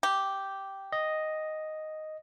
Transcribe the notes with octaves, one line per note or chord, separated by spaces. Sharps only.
G4
D#5